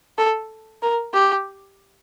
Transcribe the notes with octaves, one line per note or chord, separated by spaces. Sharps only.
A4
A#4
G4